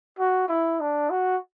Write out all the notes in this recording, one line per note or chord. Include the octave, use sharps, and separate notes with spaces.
F#4
E4
D4
F#4